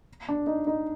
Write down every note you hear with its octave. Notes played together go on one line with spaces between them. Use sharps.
D4
D#4
D#4